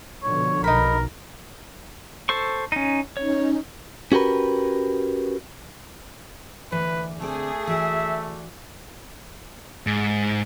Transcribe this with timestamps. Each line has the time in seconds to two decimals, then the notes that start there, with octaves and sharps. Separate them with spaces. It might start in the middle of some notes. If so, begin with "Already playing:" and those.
0.23 B2 D3 F3 C#5
0.64 B1 D#4 A#4 B5
2.29 A4 C5 C#6
2.72 C#4 D#4
3.17 C#4 D#4 C#5
4.12 C#4 F#4 G4 A#4 B4
6.72 D2 E3 B4 D5
7.20 D3 A3 C4 G#4 D5
7.67 E3 F#4 D5 E5
9.87 G#2